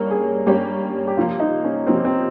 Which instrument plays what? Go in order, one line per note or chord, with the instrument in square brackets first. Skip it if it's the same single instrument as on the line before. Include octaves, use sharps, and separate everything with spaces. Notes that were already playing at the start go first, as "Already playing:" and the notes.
Already playing: [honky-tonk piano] G2 G3 A#3 C#4 [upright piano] A#4
[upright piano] G#4
[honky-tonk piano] G2 G3 A#3 C#4 [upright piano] G4
[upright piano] G4
[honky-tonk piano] C3 F3 A#3 [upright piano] F4
[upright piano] D#4
C#4
[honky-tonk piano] C3 F3 A#3 [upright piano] C4
[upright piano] C4